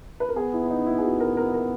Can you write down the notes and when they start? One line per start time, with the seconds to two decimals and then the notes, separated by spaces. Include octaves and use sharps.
0.20 B4
0.29 A#4
0.36 B3 G#4
0.53 E4
0.64 E4
0.70 D#4
0.86 E4
0.98 G#4
1.04 F#4
1.20 A#4
1.37 A#4
1.54 A#4